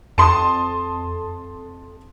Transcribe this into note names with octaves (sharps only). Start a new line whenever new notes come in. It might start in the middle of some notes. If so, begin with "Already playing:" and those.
F2 A5 C6 D#6